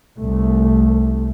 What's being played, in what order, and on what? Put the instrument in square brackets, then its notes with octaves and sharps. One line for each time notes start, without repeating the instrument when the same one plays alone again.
[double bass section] C2 A3